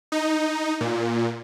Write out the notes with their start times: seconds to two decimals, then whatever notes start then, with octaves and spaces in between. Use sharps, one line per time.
0.12 D#4
0.81 A#2